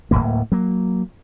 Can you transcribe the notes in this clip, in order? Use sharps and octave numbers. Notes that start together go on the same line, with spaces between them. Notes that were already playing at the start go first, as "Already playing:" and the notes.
D1 C#2 A2 A#3
F#3 A#3